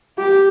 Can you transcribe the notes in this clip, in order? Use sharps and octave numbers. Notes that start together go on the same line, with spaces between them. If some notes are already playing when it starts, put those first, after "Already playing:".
G4